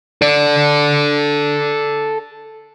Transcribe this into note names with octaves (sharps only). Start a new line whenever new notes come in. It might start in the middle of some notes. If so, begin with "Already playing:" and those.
A4 D5